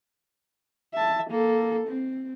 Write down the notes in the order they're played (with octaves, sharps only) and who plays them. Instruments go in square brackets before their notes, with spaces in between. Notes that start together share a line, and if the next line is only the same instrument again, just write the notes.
[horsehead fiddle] E5 A5
A#3 A4
C4